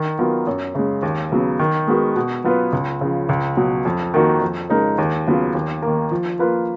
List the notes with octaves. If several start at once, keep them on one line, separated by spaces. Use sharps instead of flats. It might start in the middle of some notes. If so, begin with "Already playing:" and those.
Already playing: D#3
F#3 B3 F4 A#4
F#2
C#3 G#3
D#2
C#3 F#3 B3
D#3
G#3 B3 F#4 A#4
B2
F#3 B3 F4 B4
C#2
C#3 F3
C#2
B2 F#3
F2
D#3 A#3 D#4 F#4
F2
C#3 G#3 D#4 A#4
D#2
C#3 F#3 B3 F4
D#2
D#3 A#3
F3
A#3 F4 B4